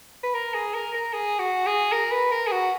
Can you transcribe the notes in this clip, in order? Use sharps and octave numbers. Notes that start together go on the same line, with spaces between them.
B4
A#4
G#4
A#4
A#4
G#4
F#4
G#4
A#4
B4
A#4
G#4
F#4